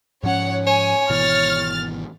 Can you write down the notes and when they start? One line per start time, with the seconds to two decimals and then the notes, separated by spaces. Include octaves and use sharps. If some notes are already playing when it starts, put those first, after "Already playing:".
0.23 G#2 F3 C#4 C#5 F#5
0.67 C#5 G#5
1.10 G#1 B2 E3 F6 A6